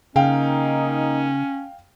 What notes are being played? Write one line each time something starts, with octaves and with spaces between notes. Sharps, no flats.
C#3 A#3 C#4 D#4 F5 G5